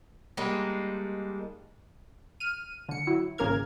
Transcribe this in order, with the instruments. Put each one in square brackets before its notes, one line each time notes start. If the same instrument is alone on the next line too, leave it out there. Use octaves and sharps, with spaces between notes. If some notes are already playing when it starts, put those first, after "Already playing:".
[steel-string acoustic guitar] G3 G#3 A#3 D4 D#4 F4
[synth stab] F6 D#7
D3 C#7
F#3 E4
G#1 C#3 A#3 A#4 F6 G#6